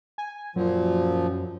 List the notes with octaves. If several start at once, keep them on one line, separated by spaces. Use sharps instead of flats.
G#5
F#2 A#2 F3